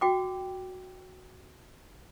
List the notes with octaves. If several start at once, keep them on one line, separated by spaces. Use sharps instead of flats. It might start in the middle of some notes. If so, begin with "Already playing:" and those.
F#4 G5 D6